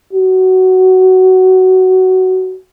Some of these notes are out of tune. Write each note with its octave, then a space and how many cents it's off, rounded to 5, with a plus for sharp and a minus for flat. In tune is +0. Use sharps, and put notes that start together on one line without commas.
F#4 +15